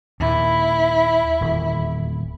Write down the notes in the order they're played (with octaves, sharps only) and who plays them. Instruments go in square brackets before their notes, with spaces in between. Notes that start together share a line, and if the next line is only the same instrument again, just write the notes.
[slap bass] D#2 A#2 [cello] E4
[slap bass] D#1 E2